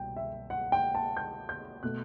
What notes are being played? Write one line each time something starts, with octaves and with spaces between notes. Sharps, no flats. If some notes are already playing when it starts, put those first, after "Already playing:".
Already playing: C2 B2 G5
E5
F#5
G5
A5
G6
G6
B2 A3 F#6